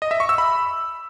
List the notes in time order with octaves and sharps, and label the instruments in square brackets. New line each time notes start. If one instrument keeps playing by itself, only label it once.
[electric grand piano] D#5
E5
C#6
E6
B5